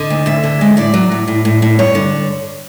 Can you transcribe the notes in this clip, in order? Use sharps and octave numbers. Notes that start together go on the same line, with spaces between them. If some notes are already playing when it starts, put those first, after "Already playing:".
Already playing: D3 D#5
D2
D2 E5
D3
G#3
A2 D5
F#3
A2
A2
A2
A2
G2 C#5
D3